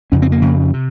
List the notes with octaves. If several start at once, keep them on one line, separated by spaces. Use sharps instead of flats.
F2 C#3 C#4
C4
A#3
F2 C#3
C3